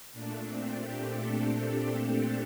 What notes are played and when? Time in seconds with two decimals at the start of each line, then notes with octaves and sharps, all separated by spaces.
0.13 A#2 A3 D4
0.44 C4
0.76 G4
1.08 A4